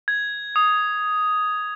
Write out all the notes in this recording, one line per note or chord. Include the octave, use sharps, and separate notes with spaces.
G#6
D#6